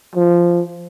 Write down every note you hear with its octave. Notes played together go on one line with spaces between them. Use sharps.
F3